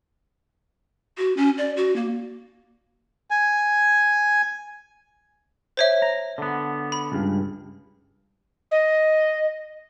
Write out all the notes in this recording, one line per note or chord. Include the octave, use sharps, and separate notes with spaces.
F#4
C#4
D5
F#4
A#3
G#5
C5 C#5 E5
A#5
D3 B3
B5
C#2 G2
D#5